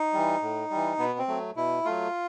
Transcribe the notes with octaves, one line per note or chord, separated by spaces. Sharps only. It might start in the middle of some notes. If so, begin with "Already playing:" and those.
Already playing: D#4
E3 G3
A2
E3 G3
B2 B3
C4
F#3 A3
B2 E4
F#3 A3 F4